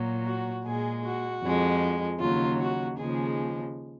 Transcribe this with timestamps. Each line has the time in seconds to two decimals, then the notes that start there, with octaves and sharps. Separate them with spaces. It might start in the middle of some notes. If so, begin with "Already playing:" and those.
Already playing: A#2 F#3
0.26 F#4
0.64 A#2 G#3 G#4
1.04 F#4
1.43 F2 F3 G#3
2.20 D#2 C#3 F#3 F4
2.60 F#4
2.98 D#2 C#3 F3 G#3 G#4